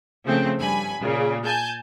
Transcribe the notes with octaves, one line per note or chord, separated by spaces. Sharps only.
C#3 F3 A3 C4
G2 G#5 B5
A#2 C#3
G#5 A5 G6